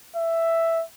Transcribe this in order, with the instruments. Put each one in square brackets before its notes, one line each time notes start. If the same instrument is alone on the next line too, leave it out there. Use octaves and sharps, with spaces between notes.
[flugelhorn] E5